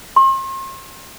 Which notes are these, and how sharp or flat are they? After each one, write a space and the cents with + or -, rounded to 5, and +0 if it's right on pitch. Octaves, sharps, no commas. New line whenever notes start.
C6 +40